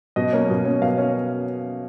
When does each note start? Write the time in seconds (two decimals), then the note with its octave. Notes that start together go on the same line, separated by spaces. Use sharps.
0.16 B2 D#5
0.33 A#3 C#4
0.49 B2
0.65 A#3 C#4
0.82 B2 F5
0.98 C#4